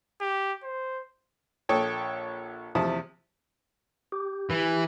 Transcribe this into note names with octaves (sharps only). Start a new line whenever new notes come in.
G4
C5
A#1 A4 C#5 G5 D#6
E2 C3 F3 E5 D#6
G4
E3